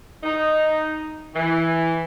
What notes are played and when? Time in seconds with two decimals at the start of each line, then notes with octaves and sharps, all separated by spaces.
0.23 D#4
1.35 E3